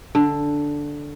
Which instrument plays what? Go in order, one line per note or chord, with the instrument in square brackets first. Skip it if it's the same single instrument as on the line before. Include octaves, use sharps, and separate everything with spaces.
[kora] D3